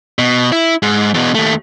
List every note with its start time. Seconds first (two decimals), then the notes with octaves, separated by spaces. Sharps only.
0.19 B2
0.52 E4
0.82 G#2
1.14 E2 B2
1.35 D#2 A3